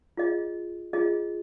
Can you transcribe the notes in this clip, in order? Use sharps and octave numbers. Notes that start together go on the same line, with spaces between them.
F4 G#4 D#5
F4 G#4 D#5